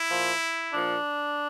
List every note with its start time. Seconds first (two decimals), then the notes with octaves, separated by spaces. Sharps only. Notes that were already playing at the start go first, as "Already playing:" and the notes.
Already playing: E4
0.09 A#2 F3
0.74 A#2 F3 D4